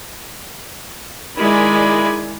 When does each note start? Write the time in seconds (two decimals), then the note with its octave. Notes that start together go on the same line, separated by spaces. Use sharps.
1.39 D#3 G#3 E4 D5 G#5 B5